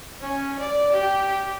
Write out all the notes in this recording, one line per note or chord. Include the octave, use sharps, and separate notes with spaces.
C#4
D5
G4